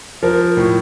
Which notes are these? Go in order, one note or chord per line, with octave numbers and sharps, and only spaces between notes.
F3 A#4
A2